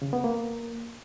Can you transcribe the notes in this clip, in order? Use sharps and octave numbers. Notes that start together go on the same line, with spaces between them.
C#3
B3
A#3